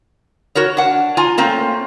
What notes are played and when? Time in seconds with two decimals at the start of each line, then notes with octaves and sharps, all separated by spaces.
0.55 F#4 A#4 C#5
0.77 D4 F#5
1.17 F4 G#5 A#5
1.38 A3 A#3 C4 C#4